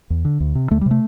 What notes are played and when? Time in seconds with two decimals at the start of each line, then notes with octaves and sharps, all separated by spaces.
0.10 E2
0.25 D3
0.40 D2
0.55 C3
0.71 D2 A3
0.81 G3
0.86 C3
0.91 A3